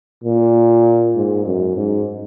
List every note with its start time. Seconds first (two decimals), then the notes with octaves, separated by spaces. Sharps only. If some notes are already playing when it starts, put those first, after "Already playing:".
0.24 A#2
1.15 G#2
1.46 F#2
1.76 G#2